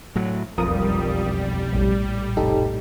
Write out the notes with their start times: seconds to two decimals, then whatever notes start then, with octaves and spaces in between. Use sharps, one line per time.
0.16 A2 F#3
0.58 E1 B1 F2 G3 F4 A#4 D#6
1.72 A#1 A2
2.37 F1 D#4 G4 A4